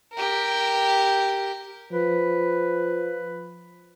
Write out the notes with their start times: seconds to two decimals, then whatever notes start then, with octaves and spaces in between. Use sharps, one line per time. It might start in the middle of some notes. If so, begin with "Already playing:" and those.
0.13 G4 A#4
1.92 F3 B4